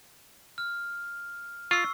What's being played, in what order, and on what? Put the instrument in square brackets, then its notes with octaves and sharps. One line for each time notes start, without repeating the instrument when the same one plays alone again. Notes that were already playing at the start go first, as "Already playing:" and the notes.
[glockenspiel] F6
[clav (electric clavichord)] F4 [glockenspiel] C#6 E6 C7